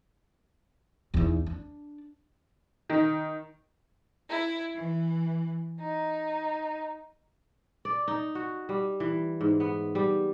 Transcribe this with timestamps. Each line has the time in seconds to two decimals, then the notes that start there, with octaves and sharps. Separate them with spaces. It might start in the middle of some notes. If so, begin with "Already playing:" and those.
1.14 E2 D#4
1.46 D4
2.90 D#3
4.29 E4
4.76 E3
5.80 D#4
7.85 D5
8.08 D#4
8.35 F#4
8.69 G3
9.00 E3
9.41 G#2
9.60 B3
9.95 G3